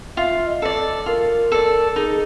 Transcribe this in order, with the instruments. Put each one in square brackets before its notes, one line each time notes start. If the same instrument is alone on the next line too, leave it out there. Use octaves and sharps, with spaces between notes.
[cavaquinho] F4 [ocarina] E5
[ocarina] D#5
[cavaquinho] A4 D5
[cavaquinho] F4 [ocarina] A#4
[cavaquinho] A4 D5
[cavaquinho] D#4 [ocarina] G#4